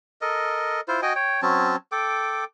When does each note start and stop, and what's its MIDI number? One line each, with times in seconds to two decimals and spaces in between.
0.21 0.80 69
0.21 0.80 70
0.21 0.80 75
0.88 1.01 64
0.88 1.01 65
0.88 1.01 72
1.02 1.13 66
1.02 1.13 75
1.02 1.13 79
1.02 1.13 80
1.15 1.41 73
1.15 1.41 79
1.42 1.76 54
1.42 1.76 60
1.42 1.76 61
1.42 1.76 81
1.92 2.44 69
1.92 2.44 79
1.92 2.44 86